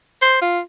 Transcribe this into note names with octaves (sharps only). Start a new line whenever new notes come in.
C5
F4